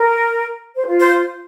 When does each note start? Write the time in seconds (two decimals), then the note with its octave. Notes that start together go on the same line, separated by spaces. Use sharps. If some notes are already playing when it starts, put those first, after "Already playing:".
Already playing: A#4
0.76 C5
0.87 F4
1.00 C5